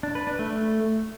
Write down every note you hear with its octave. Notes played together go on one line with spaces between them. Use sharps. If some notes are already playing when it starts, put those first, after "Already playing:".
D4
B4
D4
A3